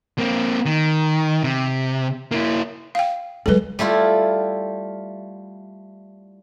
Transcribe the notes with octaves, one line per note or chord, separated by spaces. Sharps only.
A#3 C4
D#3
C3
A#3 E4
F5 G5
F#3 G#3 A4 B4
G3 A3 E4 F4